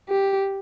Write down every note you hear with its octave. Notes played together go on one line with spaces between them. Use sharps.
G4